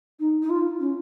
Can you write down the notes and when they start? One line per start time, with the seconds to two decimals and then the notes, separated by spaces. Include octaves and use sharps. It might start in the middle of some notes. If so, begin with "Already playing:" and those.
0.20 D#4
0.43 D#4
0.50 F4
0.80 C#4